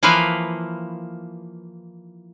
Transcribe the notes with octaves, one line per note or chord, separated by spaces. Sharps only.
E3 F3 A#3 B4 F5